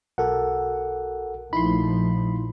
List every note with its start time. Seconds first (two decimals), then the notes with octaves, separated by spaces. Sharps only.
0.18 B1 F#4 A4 A#4 F#5
1.53 A#1 F3 A3 D#4 E4 B5 C6